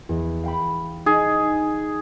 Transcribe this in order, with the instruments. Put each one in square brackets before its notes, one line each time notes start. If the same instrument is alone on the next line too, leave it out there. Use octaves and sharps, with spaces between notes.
[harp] E2
F5 G5 B5
[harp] D#4 [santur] G#4